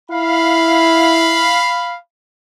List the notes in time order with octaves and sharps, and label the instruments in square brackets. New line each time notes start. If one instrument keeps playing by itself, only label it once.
[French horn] E4 [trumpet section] F5 B5